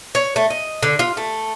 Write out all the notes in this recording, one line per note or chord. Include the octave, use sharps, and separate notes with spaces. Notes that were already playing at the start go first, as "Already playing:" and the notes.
C#5
A3
D#5
D3
F4
A3